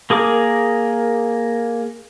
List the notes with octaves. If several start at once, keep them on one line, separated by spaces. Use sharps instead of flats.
A#3 G#4 A#4 D6